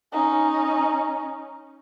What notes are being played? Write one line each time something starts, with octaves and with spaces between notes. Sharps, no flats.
C#4 D#4